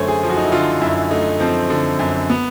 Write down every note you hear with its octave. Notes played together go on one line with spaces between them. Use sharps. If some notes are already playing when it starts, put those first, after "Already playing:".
Already playing: F#2 D3 A3 C5 C#5
G#4
F3
F#4
D#4
E4
D3 F4
F#2 E4
A3 D#4
F3 C4
D3
F#2
B3